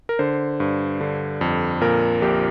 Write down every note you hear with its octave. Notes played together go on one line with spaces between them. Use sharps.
A#4
D3 C5
G2
D3
F2
A#2 A#4
A#1 G4